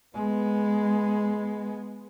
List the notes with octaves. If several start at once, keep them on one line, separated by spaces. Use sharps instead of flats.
G#3 B3